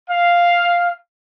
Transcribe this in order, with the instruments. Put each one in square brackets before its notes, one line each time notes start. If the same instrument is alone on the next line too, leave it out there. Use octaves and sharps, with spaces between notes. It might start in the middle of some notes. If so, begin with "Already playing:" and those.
[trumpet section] F5